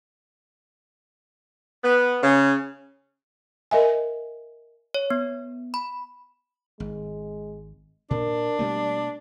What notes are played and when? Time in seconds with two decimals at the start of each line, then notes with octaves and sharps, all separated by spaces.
1.83 B3
2.22 C#3
3.71 A#4 D#5 E5 G#5
4.94 C#5
5.10 B3
5.74 B5
6.80 G#1 G#3
8.11 A#2 D4 A#4
8.59 B2 G3 A3 A#3